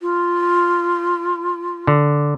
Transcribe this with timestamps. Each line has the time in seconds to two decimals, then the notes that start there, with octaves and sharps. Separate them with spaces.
0.01 F4
1.87 D3